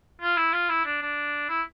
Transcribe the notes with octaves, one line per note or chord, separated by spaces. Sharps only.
F4
E4
F4
E4
D4
D4
E4